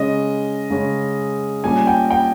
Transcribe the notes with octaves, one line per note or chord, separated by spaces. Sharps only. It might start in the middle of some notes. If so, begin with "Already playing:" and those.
Already playing: C#3 G#3 C#4 D#5
C#3 G#3 C#4
A#2 G3 C#4 G#5
G5
G5